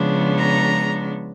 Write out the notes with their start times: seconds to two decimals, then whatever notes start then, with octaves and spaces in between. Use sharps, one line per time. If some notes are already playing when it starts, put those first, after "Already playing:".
Already playing: C#3 F3 G#3 B3 D4
0.38 A#5